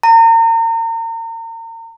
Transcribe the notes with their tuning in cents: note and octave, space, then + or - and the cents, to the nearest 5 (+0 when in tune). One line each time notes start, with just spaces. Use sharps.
A#5 -35